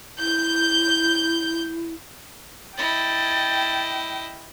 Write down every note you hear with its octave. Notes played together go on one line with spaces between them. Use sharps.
E4 G6
E4 D#5 G5 A6